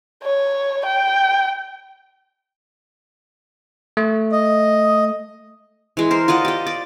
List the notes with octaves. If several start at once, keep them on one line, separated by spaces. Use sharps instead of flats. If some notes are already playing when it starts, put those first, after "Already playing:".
C#5
G5
A3
D#5
E3 G#3
A#4 C5
F4 D5 D#5 F#5
G4 D#5
D5